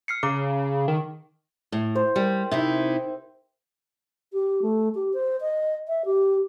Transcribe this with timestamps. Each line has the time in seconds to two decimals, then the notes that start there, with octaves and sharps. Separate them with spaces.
0.08 F6 C7 C#7
0.23 C#3 A#5 D6
0.88 D#3
1.72 A2
1.95 C5
2.16 G3 G4 A#4
2.51 C3 D#4 E4 E5
4.33 G4
4.62 A3
4.94 G4
5.13 C5
5.40 D#5
5.88 E5
6.05 G4